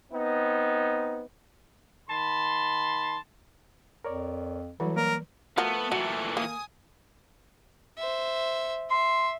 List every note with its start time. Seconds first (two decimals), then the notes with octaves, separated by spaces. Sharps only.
0.11 B3 C4 D#4
2.10 D#3 A5 B5 C6
4.05 F2 A#4 C#5 D5
4.80 E3 F#3 G3 E4 F#4 A4
4.97 A#3 A#4 D5
5.58 F3 A3 B3 F#4 A4 A#4
5.92 A#2 E3 F#3
6.37 A#3 G#5 D#6
7.98 C5 E5
8.91 E5 C6